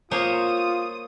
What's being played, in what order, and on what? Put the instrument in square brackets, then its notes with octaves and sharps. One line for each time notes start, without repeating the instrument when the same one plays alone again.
[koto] A#3 C5 C#5 [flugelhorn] F4 [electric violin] D#6